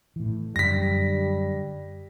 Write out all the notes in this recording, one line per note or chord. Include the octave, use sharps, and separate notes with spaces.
A2 E3
F#2 D3 G3 A#6 B6